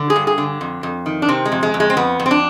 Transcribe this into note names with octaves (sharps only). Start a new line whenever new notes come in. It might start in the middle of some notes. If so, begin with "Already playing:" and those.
Already playing: D3
G#4
G2
G#4
D3
F2
F2
D#3
D4
C3 C4
G#3
F2
G#3
F2
G#3
C4
F2 B3
F2
C4
D4